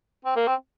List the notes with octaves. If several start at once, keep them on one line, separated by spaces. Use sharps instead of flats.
C4
A#3
C4